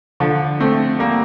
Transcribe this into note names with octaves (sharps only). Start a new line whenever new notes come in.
D3 F3
A3 C4
G3 A#3